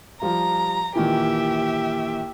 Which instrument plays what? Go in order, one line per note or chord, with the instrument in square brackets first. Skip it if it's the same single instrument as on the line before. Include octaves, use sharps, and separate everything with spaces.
[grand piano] F3 G3 F4 [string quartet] A#5
[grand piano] A#2 D#3 E3 [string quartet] G4 E5